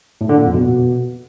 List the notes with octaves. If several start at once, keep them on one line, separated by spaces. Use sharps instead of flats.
A2
D3
A#2
F2
B2